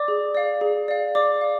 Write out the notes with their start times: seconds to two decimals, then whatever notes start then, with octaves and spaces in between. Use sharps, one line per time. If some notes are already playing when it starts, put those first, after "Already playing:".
Already playing: D5 D6
0.08 G#4
0.35 D5 F5
0.61 G#4
0.88 D5 F5
1.15 G#4 D5 D6
1.41 D5 F5